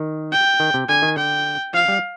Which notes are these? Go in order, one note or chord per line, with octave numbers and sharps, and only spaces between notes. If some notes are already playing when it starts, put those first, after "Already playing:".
Already playing: D#3
G5
D#3
C3
D3 G#5
D#3
D3 G5
F3 F5
G3